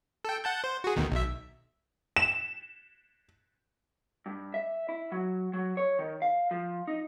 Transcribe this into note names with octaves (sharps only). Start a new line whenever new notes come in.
A4 G5
F#5 A5 G6
C5
F#4 G#4
D2 B2 D#3
B1 E5
E7
G2
E5
E4
F#3
F#3
C#5
D#3
F5
F3
D#4